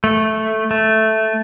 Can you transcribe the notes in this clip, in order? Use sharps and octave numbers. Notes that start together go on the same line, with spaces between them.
A3
A3